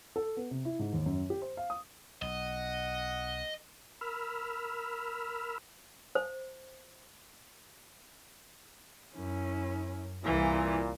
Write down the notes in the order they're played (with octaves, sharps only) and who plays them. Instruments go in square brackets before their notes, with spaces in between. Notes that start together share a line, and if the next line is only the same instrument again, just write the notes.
[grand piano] A4
B3
C3
E4
G#2
D#2
F#2
G4
C5
F5
D#6
[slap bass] B1 [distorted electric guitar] D#5 [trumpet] F#5
[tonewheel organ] A#4 B5 E6 F6
[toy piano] C5
[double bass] F#2 [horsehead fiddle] C#4 E4
[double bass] C2 [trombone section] A#2 [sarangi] E3 [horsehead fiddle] E4